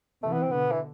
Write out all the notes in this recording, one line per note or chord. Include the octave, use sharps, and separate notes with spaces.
C3 E3 A3
B3
C4
B2 D3 B3
E3